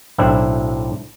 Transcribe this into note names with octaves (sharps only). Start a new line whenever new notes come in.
B1 A2 C4 D4 E4